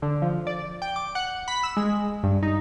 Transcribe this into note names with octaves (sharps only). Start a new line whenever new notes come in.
D3
F3
D5
G5
D6
F#5
B5
E6
G#3
G2
D#4